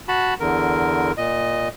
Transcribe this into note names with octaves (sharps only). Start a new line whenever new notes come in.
F#4 A5 B5
E2 D3 A#4
A#2 D#5